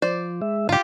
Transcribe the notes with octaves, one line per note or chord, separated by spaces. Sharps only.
F3 C5 D5
G#3 E5
G#2 D3 F4 G4